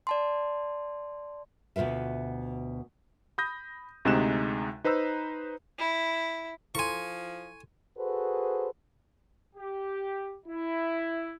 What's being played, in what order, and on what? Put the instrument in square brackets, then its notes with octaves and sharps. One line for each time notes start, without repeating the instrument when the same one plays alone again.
[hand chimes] D5 A5 C6
[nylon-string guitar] D2 B2 F4 B4 E5
[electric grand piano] B5 D#6 G6 A#6
D2 C3 G#3 D#4 F#6 E7
D#4 B4 C5 A#5 E6
[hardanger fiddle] E4
[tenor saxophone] F3 [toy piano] E4 A4 C6 [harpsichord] G#5 C#6
[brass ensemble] F#4 G#4 A4 B4 C5
G4
E4